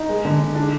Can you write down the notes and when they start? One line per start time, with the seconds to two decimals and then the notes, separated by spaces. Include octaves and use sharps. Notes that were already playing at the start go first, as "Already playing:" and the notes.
Already playing: D#4
0.09 G#3
0.25 D3
0.40 D3
0.55 D4